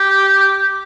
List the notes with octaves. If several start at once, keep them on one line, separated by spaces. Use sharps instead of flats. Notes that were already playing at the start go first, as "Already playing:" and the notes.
Already playing: G4